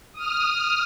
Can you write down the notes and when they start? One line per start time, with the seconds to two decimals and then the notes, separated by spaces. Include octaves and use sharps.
0.13 D#6 F6